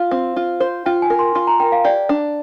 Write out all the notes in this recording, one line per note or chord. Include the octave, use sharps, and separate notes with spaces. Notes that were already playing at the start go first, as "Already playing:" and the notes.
Already playing: F4 F5
C4
F4
C5
F4 G5
G#5
A#4
C6
F4 C6
A#5
A#4 G5
F5
G4 D5
D4